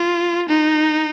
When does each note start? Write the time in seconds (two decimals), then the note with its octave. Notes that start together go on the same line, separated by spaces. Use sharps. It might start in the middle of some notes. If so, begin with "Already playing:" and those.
Already playing: F4
0.49 D#4